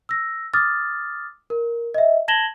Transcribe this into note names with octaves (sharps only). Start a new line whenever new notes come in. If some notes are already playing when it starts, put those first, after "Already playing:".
E6 A#6
D6 D#6 F6 A6
A#4
D#5 E5
A5 G#6 A#6 E7 F#7 G7